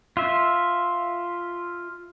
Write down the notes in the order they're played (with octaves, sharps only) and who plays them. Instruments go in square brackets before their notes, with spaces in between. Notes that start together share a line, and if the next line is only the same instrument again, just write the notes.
[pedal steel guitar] F4 E5